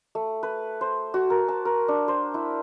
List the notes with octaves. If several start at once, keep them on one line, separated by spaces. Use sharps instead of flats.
A3
B4
C5
F#4
A#4
A5
A#4
D4
C5
E4